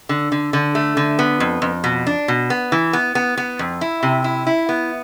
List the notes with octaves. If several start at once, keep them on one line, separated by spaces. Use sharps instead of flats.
D3
D3
D3
A3
D3
B3
F2
F2
B2
D4
B2
B3
E3
B3
B3
B3
F2
E4
C3
E4
E4
B3